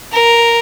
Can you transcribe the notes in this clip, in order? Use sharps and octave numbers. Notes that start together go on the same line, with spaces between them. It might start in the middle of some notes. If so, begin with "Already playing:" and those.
A#4